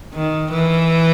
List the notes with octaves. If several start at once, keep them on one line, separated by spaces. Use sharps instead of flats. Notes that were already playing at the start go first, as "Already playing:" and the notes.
D#3
E3